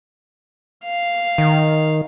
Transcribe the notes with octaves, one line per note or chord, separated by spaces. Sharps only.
F5
D#3